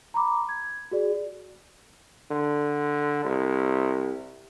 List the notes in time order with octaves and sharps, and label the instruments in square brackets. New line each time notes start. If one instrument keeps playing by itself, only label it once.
[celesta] A#5 B5 D6
G#6
F#4 G#4 D5
[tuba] D3
C2